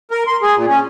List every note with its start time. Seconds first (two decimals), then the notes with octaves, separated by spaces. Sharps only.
0.11 A#4
0.27 C6
0.42 G#4
0.56 A#2
0.68 C#4